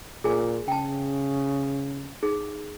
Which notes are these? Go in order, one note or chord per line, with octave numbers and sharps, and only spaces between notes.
A#2 G#4 G#5
C#3 G5 A5
D#4 G#4